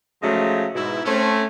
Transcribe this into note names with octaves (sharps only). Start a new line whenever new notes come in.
C#3 F3 F#3 G#3 A3 D#4
G#2 B2 E4
A3 C4 C#4